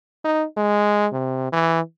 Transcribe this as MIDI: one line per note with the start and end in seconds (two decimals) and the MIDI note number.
0.24 0.44 63
0.57 1.07 56
1.12 1.50 48
1.52 1.80 52